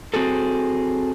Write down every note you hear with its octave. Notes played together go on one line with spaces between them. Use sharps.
C4 F#4 G#4 A4